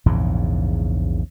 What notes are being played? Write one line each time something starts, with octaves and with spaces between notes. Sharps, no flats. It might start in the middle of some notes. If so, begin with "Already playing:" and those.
A#1 E2 G#2 C#3